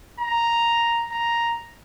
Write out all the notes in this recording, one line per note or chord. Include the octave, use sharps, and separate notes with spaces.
A#5
A#5